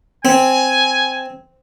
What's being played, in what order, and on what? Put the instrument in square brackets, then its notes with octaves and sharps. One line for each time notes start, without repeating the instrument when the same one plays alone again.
[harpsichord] C4 [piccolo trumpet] G#5